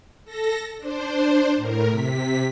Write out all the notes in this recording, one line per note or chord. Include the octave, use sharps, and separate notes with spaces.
A4 A#6
D4 C5
A2 A#4
C3 B6